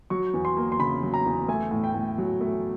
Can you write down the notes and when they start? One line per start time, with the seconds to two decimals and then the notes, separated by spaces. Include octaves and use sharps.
0.10 F#3 C#6
0.34 E2
0.45 C6
0.57 A#3
0.72 C6
0.79 C#3 B5
1.03 F#3
1.14 A#5
1.26 E2
1.48 A3 G#5
1.71 A2
1.84 G5
1.94 A2
2.18 F#3
2.41 A3